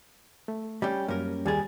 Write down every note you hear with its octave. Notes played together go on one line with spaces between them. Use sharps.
A3
G3 C#4 G4
F#2 G3 A#3 C#4 A#4
D#2 G3 G#4 G#5 A6